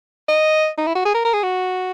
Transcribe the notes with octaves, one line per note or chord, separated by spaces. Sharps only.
D#5
D#4
E4
F#4
G#4
A#4
A#4
G#4
F#4